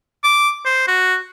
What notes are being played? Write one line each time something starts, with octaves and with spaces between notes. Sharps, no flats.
D6
C5
F#4